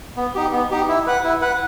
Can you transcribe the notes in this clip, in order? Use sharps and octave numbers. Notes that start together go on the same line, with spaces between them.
B3
D#4 G4
B3
D#4 G4
E4
B4 F#5
E4
B4 F#5